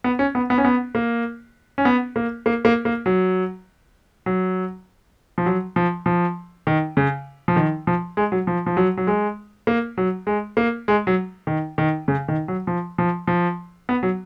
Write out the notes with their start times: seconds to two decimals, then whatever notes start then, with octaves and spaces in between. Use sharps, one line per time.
0.04 B3
0.19 C#4
0.35 B3
0.50 B3
0.58 C#4
0.65 B3
0.95 A#3
1.78 C#4
1.85 B3
2.16 A#3
2.46 A#3
2.65 A#3
2.85 A#3
3.06 F#3
4.26 F#3
5.38 F3
5.46 F#3
5.76 F3
6.06 F3
6.67 D#3
6.97 C#3
7.48 F3
7.56 D#3
7.87 F3
8.17 G#3
8.32 F#3
8.47 F3
8.66 F3
8.77 F#3
8.97 F#3
9.07 G#3
9.67 A#3
9.98 F#3
10.27 G#3
10.57 A#3
10.88 G#3
11.07 F#3
11.47 D#3
11.78 D#3
12.08 C#3
12.28 D#3
12.48 F#3
12.67 F3
12.98 F3
13.27 F3
13.89 B3
14.03 F#3